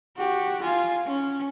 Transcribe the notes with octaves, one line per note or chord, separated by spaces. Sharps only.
F#4 G4
F4 G#5
C#4